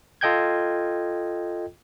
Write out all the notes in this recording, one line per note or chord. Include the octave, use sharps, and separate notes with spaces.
F4 A4 D#5 G5 G6 G#6